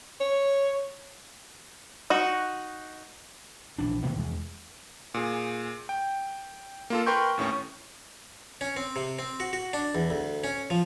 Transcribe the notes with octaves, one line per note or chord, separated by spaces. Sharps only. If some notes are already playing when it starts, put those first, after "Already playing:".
C#5
D#4 F#4
A#1 E3 D4
B2 D#3 A#3 B3
E2 G#3
A#2 G#4
G5
A#3 F4 A4
A#4 B4 G5 C6 C#6 G6
D#2 A2 C#4 C#6
C#4
C4
C3
C4
F#4
F#4
D4
E2
D2
C#4
F3